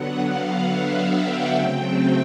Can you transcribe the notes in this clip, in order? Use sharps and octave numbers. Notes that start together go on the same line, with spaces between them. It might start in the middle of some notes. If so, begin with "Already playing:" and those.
Already playing: D3 F#3 B3 F#5
F5
E5
G5
C#3 F#3 A3 C4